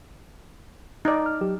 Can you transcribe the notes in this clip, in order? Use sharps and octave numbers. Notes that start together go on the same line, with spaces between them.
D#4 D5 A#5
F6
F#3 G4